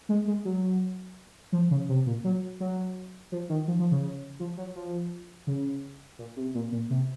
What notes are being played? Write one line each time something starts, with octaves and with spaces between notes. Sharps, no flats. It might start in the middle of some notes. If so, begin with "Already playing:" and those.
G#3
G#3
F#3
F3
C#3
C3
A#2
F#3
F#3
F3
D#3
F3
F3
C#3
F3
F#3
F3
C#3
A#2
C3
A#2
A#2
C3